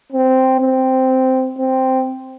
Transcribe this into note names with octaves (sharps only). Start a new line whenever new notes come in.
C4
C4
C4